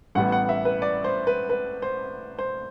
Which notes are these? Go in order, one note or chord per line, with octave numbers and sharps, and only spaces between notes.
A1 A2 G3 B3 F#5
F#5
E5
B4
D5
C5
B4
B4
C5
C5